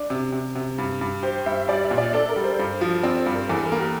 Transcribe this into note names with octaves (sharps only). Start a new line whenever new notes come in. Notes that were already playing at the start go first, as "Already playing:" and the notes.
Already playing: D4
C3
C3
C3
G2
G2
G4 C5
G2 E5
G3 D5
E5
A#2
D5
D4 A4
A#4
G3
C5
G2
F3
C4 D5
C5
G2
A#4
E2 A4
A#4
A#3
G4